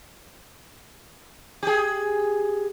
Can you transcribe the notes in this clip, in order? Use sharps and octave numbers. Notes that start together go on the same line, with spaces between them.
G4 G#4